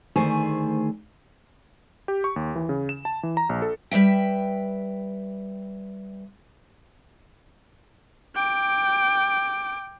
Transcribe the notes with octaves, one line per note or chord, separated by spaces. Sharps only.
D2 D#3 A3 G#4 C5 G#5
G4
C#6
D#2
E3
C#3
E7
A5
E3
A#5
A#1
A4
G3 B4 E5 G5
G5 D6